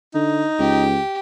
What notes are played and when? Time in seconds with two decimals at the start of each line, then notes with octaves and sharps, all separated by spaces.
0.15 D3 D#4
0.59 C#2 G4